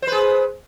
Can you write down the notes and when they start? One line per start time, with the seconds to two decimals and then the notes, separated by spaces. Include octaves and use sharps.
0.02 C5
0.07 B4
0.12 G#4